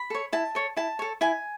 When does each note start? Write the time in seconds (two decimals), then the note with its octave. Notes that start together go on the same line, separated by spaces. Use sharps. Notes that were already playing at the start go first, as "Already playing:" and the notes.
Already playing: B5
0.10 A4 C#5
0.33 E4 A5
0.55 A4 C#5
0.77 E4 A5
0.99 A4 C#5
1.21 E4 G#5